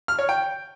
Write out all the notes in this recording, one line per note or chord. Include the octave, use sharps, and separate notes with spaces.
F6
C#5
G5